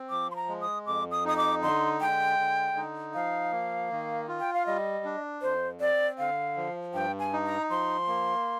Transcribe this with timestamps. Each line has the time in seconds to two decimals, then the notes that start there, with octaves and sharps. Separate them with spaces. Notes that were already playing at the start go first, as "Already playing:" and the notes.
Already playing: C4
0.10 F3 D6
0.31 C6
0.36 A#5
0.48 G#3
0.61 D#6
0.86 F2 D6
1.11 D#6
1.25 D#4 D#6
1.37 D6
1.62 D3 C6
2.01 G#3 G5
2.39 D3
2.77 D#4
3.14 F3 F5
3.52 A#3
3.91 D#3
4.28 F4
4.40 G5
4.54 F5
4.66 G3 D#5
5.05 D4
5.42 F2 C5
5.80 C4 D5
6.18 D3 F5
6.57 F3
6.94 G2 G5
7.19 G#5
7.33 D#4
7.45 A#5
7.70 F3 C6
8.08 A#3